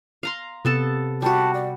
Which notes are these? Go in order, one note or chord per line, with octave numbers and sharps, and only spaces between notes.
F5 A#5 C6
C3 B3 A4 A5
G3 F#4 A5
D5